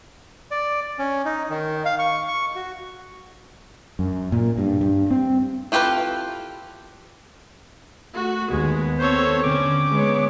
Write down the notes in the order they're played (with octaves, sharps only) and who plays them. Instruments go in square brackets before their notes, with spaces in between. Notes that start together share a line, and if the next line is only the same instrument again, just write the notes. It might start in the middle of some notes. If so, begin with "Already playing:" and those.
[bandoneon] D5
C#4
D#4
D#3
F5
C#6
C#6
F#4
[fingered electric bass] F#2
A#2
G2
G2
C4
[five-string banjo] E4 F4 G4 A4 B4
[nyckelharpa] A3 [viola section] F#4
[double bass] D#2 [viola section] G#3 [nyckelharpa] B3
[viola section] C4 A4 C#5 [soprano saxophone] C5
[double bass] D3 [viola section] C4 C#4 [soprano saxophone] D6
[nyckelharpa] G#3 C#5 [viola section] B3